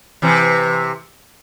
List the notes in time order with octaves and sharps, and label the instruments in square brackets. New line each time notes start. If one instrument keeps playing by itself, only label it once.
[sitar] C3 E3